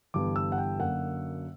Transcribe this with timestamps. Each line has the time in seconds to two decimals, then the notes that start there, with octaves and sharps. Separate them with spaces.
0.14 G1 G2 E3 B3 D6
0.36 E6
0.52 F#5
0.58 G5
0.79 F#2 D3 F#3 A#3 F#5